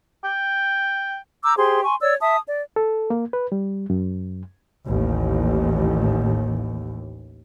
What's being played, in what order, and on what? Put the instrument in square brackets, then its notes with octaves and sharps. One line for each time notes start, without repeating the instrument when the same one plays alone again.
[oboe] G5
[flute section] A#5 D6 E6 G6
G4 G#4 C5 C6
G#5 C6 C#6
C#5 D5 E6
E5 A5 D#6
D5
[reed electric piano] A4
A#3
B4
G3
F#2
[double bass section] A1 D#2